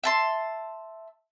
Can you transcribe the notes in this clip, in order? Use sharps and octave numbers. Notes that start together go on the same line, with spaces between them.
E5 A5 C6